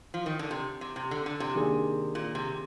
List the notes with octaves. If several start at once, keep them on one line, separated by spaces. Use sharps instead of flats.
F3
D#3
D3
C3
C3
C3
D3
D3
C3
D#3 A#3 D4 G#4
A#2
C3